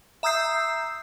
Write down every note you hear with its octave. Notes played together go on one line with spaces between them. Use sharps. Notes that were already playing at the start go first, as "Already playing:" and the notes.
E5 A#5 D#6 E6 G6 C7